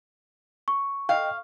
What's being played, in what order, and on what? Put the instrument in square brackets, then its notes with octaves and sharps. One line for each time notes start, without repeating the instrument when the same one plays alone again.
[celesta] C#6
[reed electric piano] D#5 G5 [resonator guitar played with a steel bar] F5